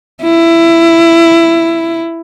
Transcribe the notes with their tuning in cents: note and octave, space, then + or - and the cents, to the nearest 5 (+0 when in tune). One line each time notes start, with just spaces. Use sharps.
E4 +15